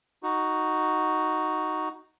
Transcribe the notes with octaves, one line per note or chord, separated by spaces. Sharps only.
D#4 F#4